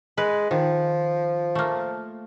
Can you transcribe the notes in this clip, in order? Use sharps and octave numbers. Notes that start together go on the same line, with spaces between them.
G#3 B4
D#3 F3
A3 A#3